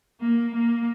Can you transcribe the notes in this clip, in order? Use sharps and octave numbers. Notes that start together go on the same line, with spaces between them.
A#3
A#3